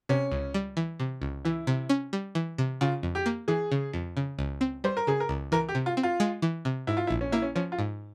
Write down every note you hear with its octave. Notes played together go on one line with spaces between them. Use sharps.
C3 C#4
C#2
G3
E3
C3
C#2
E3 E4
C3
C#4
G3
E3
C3
C#3 F4
F2
G4
A#3
E3 G#4
C#3
F2
C#3
C#2
C4
G3 C5
A#4
C#3 G#4
A#4
C#2
E3 A#4
G4
C3
F4
C4
F4
G#3
E3
C3
G#2 E4
F4
E4
A#1
C#4
A#3 E4
C#4
F3 C#4
F4
G#2